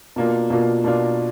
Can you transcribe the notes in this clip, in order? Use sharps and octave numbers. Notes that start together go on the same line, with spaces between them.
B2 A#3 D4 F4
B2 A#3 D4 F4
B2 A#3 D4 F4